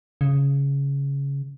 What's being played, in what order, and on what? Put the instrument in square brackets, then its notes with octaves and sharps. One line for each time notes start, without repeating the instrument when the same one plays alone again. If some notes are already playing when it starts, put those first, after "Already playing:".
[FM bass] C#3